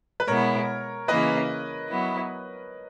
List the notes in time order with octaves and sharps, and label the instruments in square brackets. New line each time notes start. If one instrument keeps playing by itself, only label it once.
[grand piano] B4
[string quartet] B2 G#3 B3 E4 [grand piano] A#4 C#5
[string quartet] C#3 E3 A#3 E4 [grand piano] B4 D#5
[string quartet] F#3 B3 E4